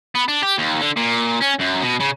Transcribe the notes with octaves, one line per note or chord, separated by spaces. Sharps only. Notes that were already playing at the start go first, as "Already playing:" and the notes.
B3
D4
G4
D#2
D3
A#2
C#4
F#2
B2
C#3